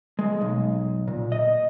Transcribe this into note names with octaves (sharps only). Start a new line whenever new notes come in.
G#3
B1
A#2
D#5